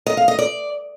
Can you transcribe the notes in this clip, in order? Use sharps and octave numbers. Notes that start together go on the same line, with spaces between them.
D#5
F5
D#5
D5